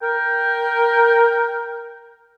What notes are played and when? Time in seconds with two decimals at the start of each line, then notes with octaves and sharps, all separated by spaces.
0.02 A#4 G5